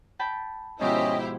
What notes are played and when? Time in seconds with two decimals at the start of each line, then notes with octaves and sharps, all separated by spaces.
0.19 G5 A5 B5
0.81 G#2 B2 F3 C#4 E4 G4 C5 D#5